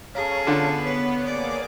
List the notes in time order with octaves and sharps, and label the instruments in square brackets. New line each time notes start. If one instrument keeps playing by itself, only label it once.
[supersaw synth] C#4 [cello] G#4 A4 [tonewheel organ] C#5 F5 A#5
[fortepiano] D3 F4 [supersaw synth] B3
[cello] B4 [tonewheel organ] C#5
[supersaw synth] A#3 G#4 D6 [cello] D5